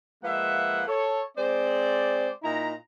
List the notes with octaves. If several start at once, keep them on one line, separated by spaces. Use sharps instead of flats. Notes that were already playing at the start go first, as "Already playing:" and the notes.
F3 G#3 A#3 B4 E5 F#5
A4 C#5
G#3 C4 C5 D5
A#2 D#4 E4 A#5